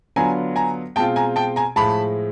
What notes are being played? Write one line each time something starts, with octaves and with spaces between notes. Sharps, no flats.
D3 F#3 B3 D4 F4 G#5 A#5
G#5 A#5
B2 G#3 C4 F4 G5 A5
G#5 A#5
G5 A5
G#5 A#5
A2 F3 G#3 A5 B5